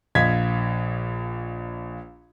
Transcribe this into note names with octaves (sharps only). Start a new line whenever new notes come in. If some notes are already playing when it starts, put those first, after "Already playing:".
A#1 D#5 F5 G#6 B6